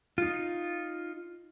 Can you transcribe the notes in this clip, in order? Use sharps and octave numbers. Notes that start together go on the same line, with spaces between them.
D#4 F4